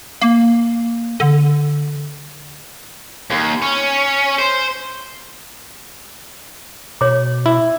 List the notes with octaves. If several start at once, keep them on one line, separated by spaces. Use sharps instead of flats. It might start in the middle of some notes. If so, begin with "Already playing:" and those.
A#3
D3
D#2
C#4
C5
B2 C#5 D6
E4